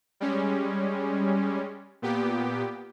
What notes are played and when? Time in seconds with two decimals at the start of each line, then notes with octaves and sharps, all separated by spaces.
0.20 G3 G#3 C#4
2.02 A#2 B3 G4